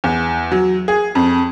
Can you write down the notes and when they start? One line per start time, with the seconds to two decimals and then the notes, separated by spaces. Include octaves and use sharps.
0.04 E2
0.52 F#3
0.88 G#4
1.15 F2